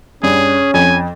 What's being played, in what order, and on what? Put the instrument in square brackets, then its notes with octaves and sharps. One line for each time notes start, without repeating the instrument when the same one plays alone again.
[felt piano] G2 [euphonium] C#4 [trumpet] G#4
[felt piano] F2 [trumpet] G#5